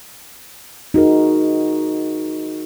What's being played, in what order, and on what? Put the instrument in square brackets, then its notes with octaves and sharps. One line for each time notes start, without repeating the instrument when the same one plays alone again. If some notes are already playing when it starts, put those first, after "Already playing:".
[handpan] D#4 F#4 G#4 A#4